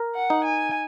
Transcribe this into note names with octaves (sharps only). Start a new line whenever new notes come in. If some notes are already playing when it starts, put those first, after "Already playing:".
Already playing: A#4
F#5
D#4
G#5